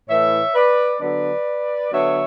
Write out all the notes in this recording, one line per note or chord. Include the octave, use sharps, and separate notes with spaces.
A2 E3 A3 C#5 E5
B4 D5
D3 F#3 B3 D4 B4 D5
D3 F#3 B3 D4 C#5 E5